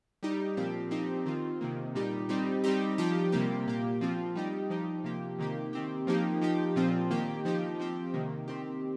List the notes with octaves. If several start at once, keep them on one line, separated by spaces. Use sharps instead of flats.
G3 D#4 G4
A#2 F3 C4 G4
F3 C4 D#4 G4
D#3 C4 F4
C3 D#3 A#3
A#2 G3 D#4 G4
G3 C4 D#4 G4
G3 C4 D#4 G4
F3 D#4 G4
C3 G3 A#3 G4
A#2 A#3 G4
F3 C4 F4
G3 D#4 G4
F3 D#4 G4
C3 F3 A#3 G4
C3 D#3 A#3 G4
D#3 C4 G4
F3 A#3 D#4 G4
F3 D#4 G4
A#2 F3 C4 F4
D#3 A#3 G4
F3 D#4 G4
F3 C4 G4
C3 D#3 A#3
D#3 C4 G4